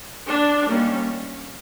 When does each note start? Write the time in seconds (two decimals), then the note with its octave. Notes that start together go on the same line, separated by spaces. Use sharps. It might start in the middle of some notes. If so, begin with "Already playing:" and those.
0.28 D4
0.66 D#3 G3 A#3 C#4